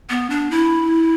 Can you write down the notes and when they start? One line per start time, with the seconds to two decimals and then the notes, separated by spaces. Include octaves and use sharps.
0.10 B3
0.30 D4
0.51 E4